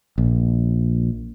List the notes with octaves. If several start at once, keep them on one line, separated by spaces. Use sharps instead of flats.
A#1